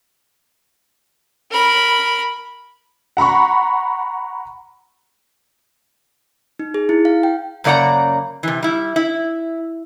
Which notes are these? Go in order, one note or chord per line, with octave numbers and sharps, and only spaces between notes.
A#4 B5
F#5 A#5 B5 C#6
D#4
G#4
E4
F5
G5
F#2 C#3 A#3 D5 F#5 A#5
C3 E3
G3 E4
E4